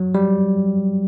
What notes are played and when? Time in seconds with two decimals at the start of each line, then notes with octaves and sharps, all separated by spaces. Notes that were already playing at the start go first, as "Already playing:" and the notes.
Already playing: F#3
0.15 G3